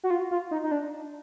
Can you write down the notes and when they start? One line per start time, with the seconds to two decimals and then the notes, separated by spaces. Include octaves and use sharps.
0.04 F#4
0.10 F4
0.31 F4
0.51 D#4
0.64 D#4
0.71 D4